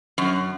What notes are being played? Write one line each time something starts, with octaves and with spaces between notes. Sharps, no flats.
F#2